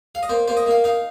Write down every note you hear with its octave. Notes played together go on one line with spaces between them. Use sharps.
F5
D#5
A#3 C5
A#3 C5
D#5
A#3 F5
D#4 F5